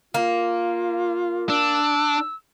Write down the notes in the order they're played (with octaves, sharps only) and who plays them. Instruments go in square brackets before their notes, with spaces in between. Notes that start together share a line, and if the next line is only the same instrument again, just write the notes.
[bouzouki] A#3 [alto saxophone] F4
[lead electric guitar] D4 [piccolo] E6